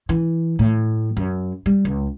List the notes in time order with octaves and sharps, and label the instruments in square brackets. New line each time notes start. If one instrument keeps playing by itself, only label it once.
[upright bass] E3
A2
F#2
G3
C#2